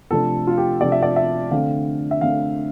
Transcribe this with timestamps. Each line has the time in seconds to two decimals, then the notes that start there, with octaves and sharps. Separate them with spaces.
0.11 C3 F3 A3 D4 A4
0.47 F4
0.58 G4
0.81 C3 F3 A3 D4 D5
0.92 E5
1.03 D5
1.16 E5
1.51 D3 A3 C4 F5
2.11 E5
2.21 D3 A3 C4 F5